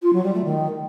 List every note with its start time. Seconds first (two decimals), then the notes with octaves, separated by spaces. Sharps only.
0.02 F4
0.12 F#3
0.23 G3
0.34 A3
0.44 D#3